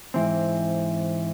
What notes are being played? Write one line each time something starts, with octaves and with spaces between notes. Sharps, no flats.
G#2 E3 C4